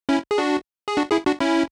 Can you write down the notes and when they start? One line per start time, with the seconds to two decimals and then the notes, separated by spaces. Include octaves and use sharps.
0.09 C#4 E4
0.31 G#4
0.38 D4 F#4
0.88 G#4
0.97 D4 F#4
1.11 E4 G#4
1.26 D4 F#4
1.40 C#4 E4